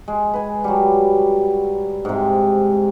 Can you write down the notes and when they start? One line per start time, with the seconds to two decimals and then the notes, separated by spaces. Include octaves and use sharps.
0.08 G#3
0.34 B4 G#5
0.64 F#3 G3
2.05 G#2 C3